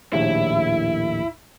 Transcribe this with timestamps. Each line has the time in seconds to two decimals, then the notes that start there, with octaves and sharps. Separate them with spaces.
0.13 A#1 D#2 A2 E4